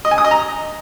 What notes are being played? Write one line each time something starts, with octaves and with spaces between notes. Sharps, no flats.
D#5
G#5
D#6
D#5
A#5